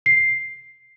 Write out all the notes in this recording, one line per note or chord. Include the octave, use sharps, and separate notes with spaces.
C7